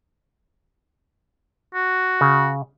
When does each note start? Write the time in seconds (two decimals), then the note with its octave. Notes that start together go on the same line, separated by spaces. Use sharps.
1.75 F#4
2.21 C#3